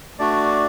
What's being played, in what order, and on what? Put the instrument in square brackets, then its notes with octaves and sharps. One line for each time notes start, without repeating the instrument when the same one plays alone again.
[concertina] A3 D4 F#4 D5